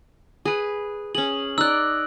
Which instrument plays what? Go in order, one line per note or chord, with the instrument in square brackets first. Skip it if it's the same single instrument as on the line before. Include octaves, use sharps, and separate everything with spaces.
[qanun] G#4 B4
[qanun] C#4 G#4 [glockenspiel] F#7
[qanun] D#4 D5 [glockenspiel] E6 F#6